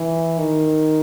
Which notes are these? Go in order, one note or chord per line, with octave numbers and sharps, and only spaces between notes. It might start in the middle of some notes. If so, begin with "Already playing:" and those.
Already playing: E3
D#3